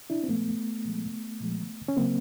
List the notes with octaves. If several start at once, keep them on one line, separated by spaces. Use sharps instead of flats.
D4 E4
C4
A#2 F3 G#3 A3 B3
A#2 F3 G#3
A#2 F3 G#3
C#4
C#3 F#3 A#3 C4